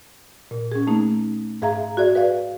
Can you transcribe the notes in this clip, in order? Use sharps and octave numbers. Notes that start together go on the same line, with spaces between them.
A#2
C#4 G#4
A3 A#3 D#4
G#2 G#4 E5 F5 A#5
F#4 G#4 D5 E5
B4 D5 F5